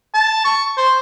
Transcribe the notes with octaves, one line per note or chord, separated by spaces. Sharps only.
A5
C#6
C5